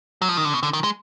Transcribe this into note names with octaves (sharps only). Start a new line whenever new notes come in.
F#3
F3
D#3
D3
B2
D3
D#3
G#3